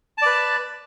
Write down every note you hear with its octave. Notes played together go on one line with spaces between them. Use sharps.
B4 D5 A5